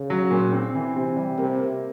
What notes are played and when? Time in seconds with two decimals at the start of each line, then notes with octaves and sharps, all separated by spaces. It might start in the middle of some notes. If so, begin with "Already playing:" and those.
Already playing: C#3
0.10 F#3
0.31 A#2
0.53 C4
0.75 E3
0.96 C3 C4
1.16 G3
1.38 C3 A#3
1.59 A#3